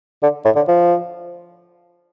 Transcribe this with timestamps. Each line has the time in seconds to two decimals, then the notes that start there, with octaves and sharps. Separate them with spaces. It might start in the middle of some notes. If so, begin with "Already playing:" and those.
0.23 D3
0.45 A2
0.56 D3
0.68 F3